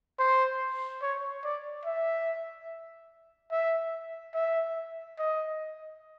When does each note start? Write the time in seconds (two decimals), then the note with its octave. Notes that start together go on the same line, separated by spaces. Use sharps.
0.19 C5
1.02 C#5
1.44 D5
1.86 E5
3.51 E5
4.34 E5
5.18 D#5